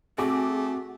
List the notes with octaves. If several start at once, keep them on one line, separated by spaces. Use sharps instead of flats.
A3 C4 F#4 G#4 D6